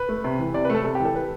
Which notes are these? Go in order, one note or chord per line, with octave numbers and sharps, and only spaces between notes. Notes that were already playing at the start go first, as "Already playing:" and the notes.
Already playing: B4
A3
C3
E3
C3 D5
A3 B4
A4
C3 A4
G4
E3
A4
B4